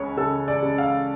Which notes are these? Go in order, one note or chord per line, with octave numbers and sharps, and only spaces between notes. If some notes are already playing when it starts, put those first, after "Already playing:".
Already playing: C#2 C#3 C#5
C#3 A4
D5
C#3
F5